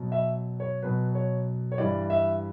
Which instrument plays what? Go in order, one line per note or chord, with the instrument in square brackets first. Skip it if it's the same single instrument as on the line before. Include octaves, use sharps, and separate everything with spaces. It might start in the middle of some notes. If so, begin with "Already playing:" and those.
Already playing: [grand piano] B2 F#3
E5
C#5
B2 F#3 B4
C#5
C#5
G2 E3 G3 D5
E5